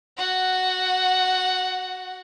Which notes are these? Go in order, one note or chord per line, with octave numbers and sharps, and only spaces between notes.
F#4 F#5